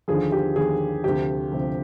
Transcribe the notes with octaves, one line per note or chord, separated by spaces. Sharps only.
D#2 D3 F3 G#4
G4
D#2 D3 F3 G#4
D2 C3 F3 G4
D2 C3 F3